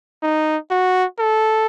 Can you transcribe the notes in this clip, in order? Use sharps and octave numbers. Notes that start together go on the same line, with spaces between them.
D#4
F#4
A4